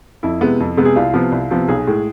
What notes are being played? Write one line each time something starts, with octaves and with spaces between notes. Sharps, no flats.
F2 E4
C3 G#3 B3
F2
C3 G#3 B3
G#4
C2 F4
C3 F3 B3
C2
C3 F3 B3
B1 G#4
A2 G#3